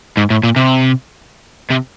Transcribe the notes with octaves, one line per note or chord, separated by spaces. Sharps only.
G#2
A2
A#2
C3
C3